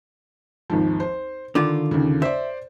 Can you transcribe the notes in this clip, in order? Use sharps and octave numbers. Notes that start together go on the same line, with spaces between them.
G#1 D#2 F3
C5
D3 D#3 F4 D6
D#2 C#3
C5 D5 E5